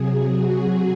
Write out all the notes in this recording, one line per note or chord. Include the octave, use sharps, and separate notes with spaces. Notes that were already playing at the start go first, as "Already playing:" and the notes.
Already playing: C3 F#3 G#4
F#4